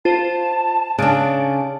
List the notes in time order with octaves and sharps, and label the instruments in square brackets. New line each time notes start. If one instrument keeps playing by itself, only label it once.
[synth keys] F4 C5 [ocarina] A5
[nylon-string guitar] C#3 D4 [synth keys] F#6 A6 D7